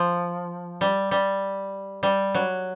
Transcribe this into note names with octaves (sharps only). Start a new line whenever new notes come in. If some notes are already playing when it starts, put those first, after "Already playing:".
Already playing: F3
G3
G3
G3
F#3